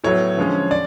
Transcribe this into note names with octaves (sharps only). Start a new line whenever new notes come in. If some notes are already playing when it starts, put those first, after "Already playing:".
A2 F#3 B3 C#5
D3 F3 G#3 C#4
D5